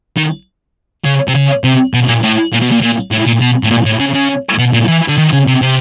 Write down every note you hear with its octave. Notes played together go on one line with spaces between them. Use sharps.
D#3
C#3
C3
C#3
C3
B2
A#2
A2
A#2
B2
A#2
A#2
A2
A#2
B2
A2
A#2
A2
C#3
C#3
B2
A#2
E3
D3
D#3
C#3
C3
C3